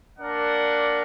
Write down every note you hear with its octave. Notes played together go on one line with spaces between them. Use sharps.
A#3 D4 A#4 D5 F#5